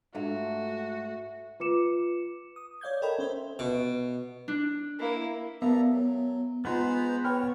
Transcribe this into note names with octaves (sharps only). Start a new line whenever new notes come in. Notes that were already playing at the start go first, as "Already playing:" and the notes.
G#2 G#3 A3 D4 F4 F#4 E5
F4 B4 D6 C#7 E7
D#6
C#5 D5 F5 G6 G#6
A4 A#4 C#5 D#5 G5 B5
C#4 C5 E5
B2
D4
A#3 E4
G3 B3 A4 A#4 E5 F5 A#5
F#3
G#3 B3 D#4 F4 C5 A#5
B4 C#5 G5 B5 F6